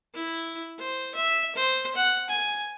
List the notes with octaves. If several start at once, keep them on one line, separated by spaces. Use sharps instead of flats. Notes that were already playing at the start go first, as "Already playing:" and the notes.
E4
C5
E5
C5
F#5
G#5